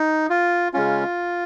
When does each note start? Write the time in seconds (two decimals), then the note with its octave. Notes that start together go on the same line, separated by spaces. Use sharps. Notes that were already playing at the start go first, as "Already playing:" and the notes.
Already playing: D#4
0.30 F4
0.74 C#3 G#3 C#4 F4